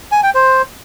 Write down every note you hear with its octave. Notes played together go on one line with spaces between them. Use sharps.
G#5
G5
C5